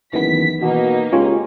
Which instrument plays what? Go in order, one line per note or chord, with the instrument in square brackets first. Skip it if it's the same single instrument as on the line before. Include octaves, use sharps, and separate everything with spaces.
[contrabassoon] F#1 [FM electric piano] D#3 E3 B3 [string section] B6
[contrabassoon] B2 [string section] A#3 D#4
[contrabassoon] C#2 [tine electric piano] F4 [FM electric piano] G4 C#5 G#5